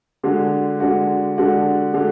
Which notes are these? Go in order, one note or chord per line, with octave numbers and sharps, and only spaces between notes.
D3 G#3 D4 F#4
D3 G#3 D4 F#4
D3 G#3 D4 F#4
D3 G#3 D4 F#4